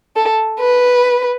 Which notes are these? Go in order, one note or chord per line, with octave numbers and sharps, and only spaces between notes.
A4
B4